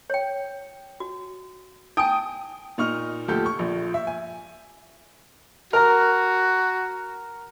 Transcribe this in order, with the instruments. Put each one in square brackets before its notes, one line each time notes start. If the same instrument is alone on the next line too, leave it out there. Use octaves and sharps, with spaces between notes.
[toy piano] C#5 G5
F#4
[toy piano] D#4 G#5 [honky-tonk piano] G5 D#6
[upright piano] A#2 D#4 D#5 C#6 F6 F7
D2 F3 G4 A4 G6
C#6
A#1 F3
E5
G#5
[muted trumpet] F#4 [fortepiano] A#4 A#5